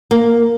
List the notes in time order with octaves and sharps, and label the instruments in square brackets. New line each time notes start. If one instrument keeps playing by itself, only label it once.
[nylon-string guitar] A#3